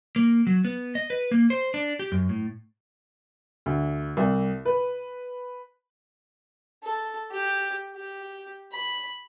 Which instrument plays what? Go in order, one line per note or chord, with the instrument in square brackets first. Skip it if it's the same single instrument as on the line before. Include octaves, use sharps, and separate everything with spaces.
[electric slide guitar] A#3
F#3
B3
D#5
B4
A#3
C5
D4
G4
F#2
A2
[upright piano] D2
C2
B4
[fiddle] A4
G4
G4
B5